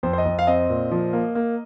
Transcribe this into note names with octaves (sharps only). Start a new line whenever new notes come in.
F2 C5
C5
D#5
F2
F5
C4 D#5
A#2
F3
A#3
A#3